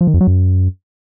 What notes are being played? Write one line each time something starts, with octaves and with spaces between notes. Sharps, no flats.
F3
D#3
F2
F#3
F#2